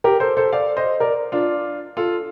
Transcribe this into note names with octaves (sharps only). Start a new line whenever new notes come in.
G4 A#4
A4 C5
A4 C5
D5 F5
C5 D#5
A#4 D5
D4 F4
F4 A4